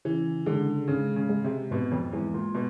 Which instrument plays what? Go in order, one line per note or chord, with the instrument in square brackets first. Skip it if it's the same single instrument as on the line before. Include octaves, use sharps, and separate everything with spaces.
[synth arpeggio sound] C#3 [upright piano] E3
[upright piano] D3 [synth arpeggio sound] G#3
[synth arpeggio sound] G#2 [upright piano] C#3
[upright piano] C#3
[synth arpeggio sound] G#3
[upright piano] C3
[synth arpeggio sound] G#2 [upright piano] B2
[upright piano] F2
[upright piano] E2 [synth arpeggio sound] G#3
[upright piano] A#2
B2